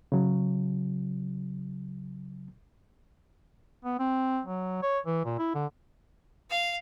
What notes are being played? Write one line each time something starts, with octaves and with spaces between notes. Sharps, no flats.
C#3 F#3
B3
C4
F#3
C#5
E3
A#2
E4
D3
F5